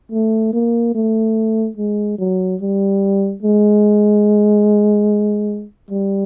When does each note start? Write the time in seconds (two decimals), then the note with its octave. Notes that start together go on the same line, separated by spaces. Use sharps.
0.11 A3
0.53 A#3
0.95 A3
1.77 G#3
2.18 F#3
2.61 G3
3.42 G#3
5.90 G3